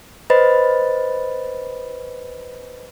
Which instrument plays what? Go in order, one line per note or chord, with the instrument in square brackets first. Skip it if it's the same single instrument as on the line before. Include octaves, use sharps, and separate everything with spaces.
[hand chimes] B4 C5 D#5 B5 A6